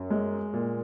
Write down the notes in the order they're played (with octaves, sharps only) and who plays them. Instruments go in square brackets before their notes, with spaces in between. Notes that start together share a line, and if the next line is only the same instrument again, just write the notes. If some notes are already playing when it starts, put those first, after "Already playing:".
Already playing: [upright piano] F#2
G#3
A#2